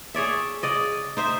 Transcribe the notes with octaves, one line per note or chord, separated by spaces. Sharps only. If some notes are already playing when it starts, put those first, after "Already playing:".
G#4 C#5 D5 E5
C#3 D5 D#5
D#4 C5 E5